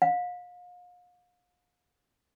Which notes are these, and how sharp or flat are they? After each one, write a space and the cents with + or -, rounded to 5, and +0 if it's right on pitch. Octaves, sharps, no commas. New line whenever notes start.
F5 +40